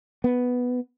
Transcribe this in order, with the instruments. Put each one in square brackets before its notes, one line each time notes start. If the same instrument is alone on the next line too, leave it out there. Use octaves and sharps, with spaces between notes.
[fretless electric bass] B3